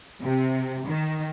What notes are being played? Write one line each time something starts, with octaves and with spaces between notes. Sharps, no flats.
C3
D#3